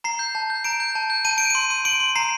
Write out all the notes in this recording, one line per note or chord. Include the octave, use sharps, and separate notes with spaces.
A#5 C7
G6
A5
G6
A#5 D7
G6
A5
G6
A5 D#7
G6 D7
C6 D#7
C6
C6 D7
C6
A#5 C7